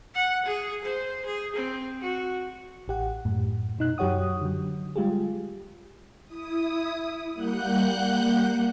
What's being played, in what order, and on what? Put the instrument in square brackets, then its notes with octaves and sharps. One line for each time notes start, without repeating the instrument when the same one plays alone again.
[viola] F#5
G#4
C5
G#4
C4
F#4
[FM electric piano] A1 G4 F#5
F#2 A2
B2 D#4 F#6
F#2 F#3 G4 C#5 F#5 D#6
D3 F#3
G3 G#3 F4 G4 G#4
[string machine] E4 D#6
G3 A#3 F#5 F#6 G6